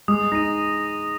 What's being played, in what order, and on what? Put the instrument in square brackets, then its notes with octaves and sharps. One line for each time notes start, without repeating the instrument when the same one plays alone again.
[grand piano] G#3 [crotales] D#6
[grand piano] D#4 [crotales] A#6 D#7